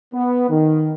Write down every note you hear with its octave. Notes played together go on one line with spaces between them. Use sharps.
B3
D#3